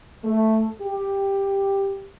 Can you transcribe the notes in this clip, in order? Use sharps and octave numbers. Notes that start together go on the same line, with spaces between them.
A3
G4